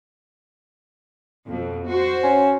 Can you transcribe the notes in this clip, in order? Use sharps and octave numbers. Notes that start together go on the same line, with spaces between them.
F2 B2
F#4 C5
C#4